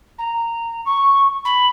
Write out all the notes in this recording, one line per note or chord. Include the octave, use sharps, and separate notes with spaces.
A#5
C#6
B5